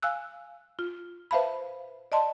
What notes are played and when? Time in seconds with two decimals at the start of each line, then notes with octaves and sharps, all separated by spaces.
0.02 F5 G#5 E6 F#6
0.79 F4
1.31 B4 C5 E5 F5 A5 B5
2.12 D5 D#5 A5 C6